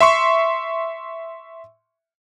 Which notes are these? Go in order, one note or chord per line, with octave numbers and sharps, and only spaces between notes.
E5 C6 C#6